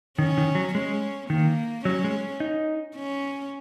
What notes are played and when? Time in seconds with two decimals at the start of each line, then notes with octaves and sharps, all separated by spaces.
0.18 D#3 C#4
0.38 D#3
0.55 F#3
0.74 G#3 C#4
1.30 D#3 A#3
1.85 F#3 C#4
2.04 G#3
2.40 D#4
2.96 C#4